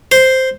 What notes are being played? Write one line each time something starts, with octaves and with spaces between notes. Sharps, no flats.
C5